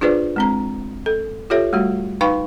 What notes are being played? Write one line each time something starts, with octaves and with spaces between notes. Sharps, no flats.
D4 F4 G#4 B4 C5 D5
G#3 C4 A#5
A4
F4 G4 A4 C#5 E5
G3 A3 F#4
D#4 B4 F5 G5 B5 C#6